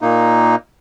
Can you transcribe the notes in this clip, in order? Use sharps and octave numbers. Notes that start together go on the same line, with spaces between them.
A#2 A#3 D#4